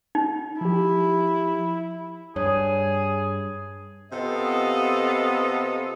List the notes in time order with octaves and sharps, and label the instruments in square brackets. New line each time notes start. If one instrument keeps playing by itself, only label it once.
[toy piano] D#4
[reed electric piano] F3 G4 [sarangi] E4
[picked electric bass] G2 [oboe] G#4 [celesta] C#5
[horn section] C3 B3 F4 A4 D#5